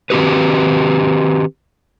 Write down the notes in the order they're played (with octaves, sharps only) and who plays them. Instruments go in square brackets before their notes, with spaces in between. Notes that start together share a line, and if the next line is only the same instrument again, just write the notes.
[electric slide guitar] D#3 C4 F#4 G4 B4